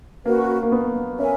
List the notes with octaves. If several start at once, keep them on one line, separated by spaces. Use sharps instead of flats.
A#3 C#4 F#4 B4
A#3
B3
C#4 A#4 E5 G#5